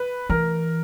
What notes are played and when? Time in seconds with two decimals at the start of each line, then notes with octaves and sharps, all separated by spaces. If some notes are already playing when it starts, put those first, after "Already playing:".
Already playing: B4
0.29 E3 A#4